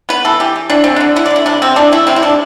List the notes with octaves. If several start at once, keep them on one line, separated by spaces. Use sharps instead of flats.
B3 B4
E3 A4
E3 G4
E3
E3 D4
D3 C4
D3 D4
D3 E4
D5
D3
E4
C3 D4
C3 C4
E3 D4
A3 E4
C3 C4
E4
C3 D4